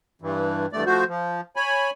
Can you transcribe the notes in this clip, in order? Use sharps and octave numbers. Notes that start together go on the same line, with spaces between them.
G2 E3
E2 G2 A3 D5
F3 A3 F#4 C5
F3
C#5 G#5 B5